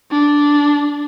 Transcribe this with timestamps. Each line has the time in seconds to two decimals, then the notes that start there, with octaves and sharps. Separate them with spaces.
0.11 D4